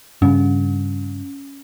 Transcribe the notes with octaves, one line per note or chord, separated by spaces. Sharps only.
G2 C#3 C#4